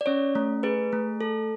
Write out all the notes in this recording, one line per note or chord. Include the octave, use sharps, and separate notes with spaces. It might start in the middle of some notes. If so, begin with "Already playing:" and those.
D5
C#4 C#5
A3
G#4 B4
A3
A4